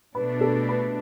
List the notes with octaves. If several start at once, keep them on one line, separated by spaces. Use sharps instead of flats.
B2 A3 D4 B4
A4
B4